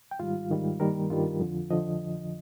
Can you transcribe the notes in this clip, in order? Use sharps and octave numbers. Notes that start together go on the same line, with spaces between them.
G5
G#2 D#3 G3 F4 F5
G#2 D#3 G3
G2 D#3 G3 A#3 A#4
G2 D#3 G3 F4
F2 D3 F3
D3 F3 D#5